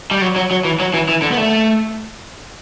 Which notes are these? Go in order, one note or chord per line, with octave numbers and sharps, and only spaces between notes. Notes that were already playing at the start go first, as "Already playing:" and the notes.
G3
F#3
F#3
F#3
E3
F#3
E3
E3
D3
B3
A3